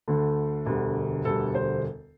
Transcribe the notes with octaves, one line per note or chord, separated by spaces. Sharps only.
D2 D3 A3
E1 D2 D3 G3
E1 D2 D3 G3 A4
C5